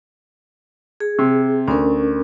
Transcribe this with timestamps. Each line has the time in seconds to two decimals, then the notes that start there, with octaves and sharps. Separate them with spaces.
1.00 G#4
1.19 C3
1.68 D2 C#4 A#4